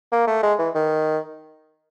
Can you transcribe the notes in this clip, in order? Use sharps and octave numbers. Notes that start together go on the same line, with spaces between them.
A#3
A3
G#3
E3
D#3